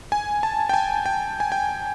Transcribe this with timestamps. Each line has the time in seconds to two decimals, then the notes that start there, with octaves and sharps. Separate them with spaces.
0.12 G#5
0.43 A5
0.69 G5
0.74 G#5
1.06 G5
1.40 G#5
1.52 G5